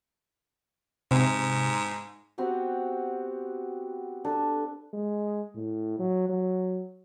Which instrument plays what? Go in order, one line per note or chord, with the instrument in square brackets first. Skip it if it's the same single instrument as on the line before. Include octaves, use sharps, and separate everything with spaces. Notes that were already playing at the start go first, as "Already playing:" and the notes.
[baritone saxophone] G#2 [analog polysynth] C3
[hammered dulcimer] B3 C4 F#4 G4
D4 A4 B4
[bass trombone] G#3
A2
F#3
F#3